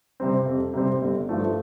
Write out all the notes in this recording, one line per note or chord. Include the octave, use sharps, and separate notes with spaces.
C3 G3 C4
F2
C3 G3 C4
G1
G2 F3 A3